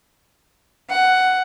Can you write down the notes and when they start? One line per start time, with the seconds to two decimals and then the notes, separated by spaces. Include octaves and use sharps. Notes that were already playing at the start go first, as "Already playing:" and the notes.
0.89 F#5